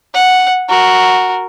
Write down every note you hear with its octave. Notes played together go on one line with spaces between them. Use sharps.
F#5
F#4 A#4